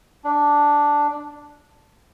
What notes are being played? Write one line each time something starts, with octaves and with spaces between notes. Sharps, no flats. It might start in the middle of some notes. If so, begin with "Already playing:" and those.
D4